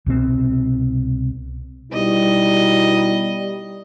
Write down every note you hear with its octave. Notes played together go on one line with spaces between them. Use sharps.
C2 B2 C4
B2 G3 D#4 E4 D#5